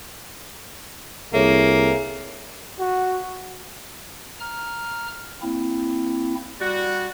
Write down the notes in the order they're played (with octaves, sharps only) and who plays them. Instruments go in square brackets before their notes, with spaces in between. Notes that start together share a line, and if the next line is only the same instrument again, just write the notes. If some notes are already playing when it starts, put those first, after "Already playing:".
[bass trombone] C2 [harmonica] A#3 [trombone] G#4 [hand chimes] A4 C#5 E5
[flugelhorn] F#4
[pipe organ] A#5 F6
A#3 C4 E4
[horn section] G3 F#4 [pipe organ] D5